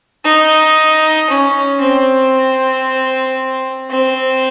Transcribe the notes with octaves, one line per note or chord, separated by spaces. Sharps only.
D#4
C#4
C4
C4